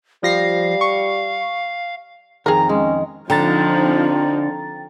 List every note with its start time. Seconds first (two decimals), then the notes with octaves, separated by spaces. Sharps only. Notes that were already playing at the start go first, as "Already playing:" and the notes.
0.23 F3 G3 F5 A#6 C7
0.81 C#6
2.46 F2 D#3 G#4 A#4 A#5
2.69 G#3 C#4
3.30 D3 F3 C4 D#4 G5 A#5 A6